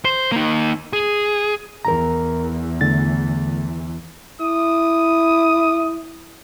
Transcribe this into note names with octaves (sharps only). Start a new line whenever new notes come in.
C5
A#3 D#4
G#4
E2 E3 A#4 A#5
D3 A3 A6
E4 D#6